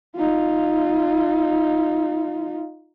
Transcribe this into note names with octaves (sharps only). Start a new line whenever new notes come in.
D#4 F4